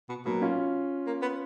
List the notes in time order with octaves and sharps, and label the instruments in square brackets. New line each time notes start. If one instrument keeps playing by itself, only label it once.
[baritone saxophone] B2
[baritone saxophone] B2 [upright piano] F#3 A#3
[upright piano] C#4 F4
[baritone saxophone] A#3
B3